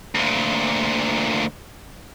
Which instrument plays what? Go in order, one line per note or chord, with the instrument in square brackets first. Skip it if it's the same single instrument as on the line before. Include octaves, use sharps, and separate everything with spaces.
[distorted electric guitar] D2 A#2